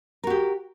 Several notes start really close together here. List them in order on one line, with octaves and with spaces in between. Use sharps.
A#4 F#4 G4